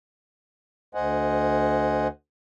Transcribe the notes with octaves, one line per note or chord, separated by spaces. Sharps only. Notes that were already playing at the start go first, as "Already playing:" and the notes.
D2 C5 D#5 F#5 G#5